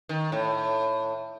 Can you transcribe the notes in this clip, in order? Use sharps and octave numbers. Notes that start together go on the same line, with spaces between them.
D#3
A2